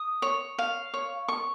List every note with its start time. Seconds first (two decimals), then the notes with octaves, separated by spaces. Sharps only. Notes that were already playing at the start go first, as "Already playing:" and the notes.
Already playing: D#6
0.22 C#5
0.58 F5
0.94 C#5
1.28 C#6